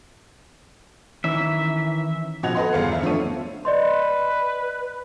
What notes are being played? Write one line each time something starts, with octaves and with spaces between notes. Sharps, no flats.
D#3 E3 C#4 E5
B2 F3 D#5 F#5 G#6 F7
A4 B4 D#5 F#5 C6
G1 E2 F5 C#7
E5
F3 A3 B3 D4 C#5 D#7
B4 D5 D#5 C6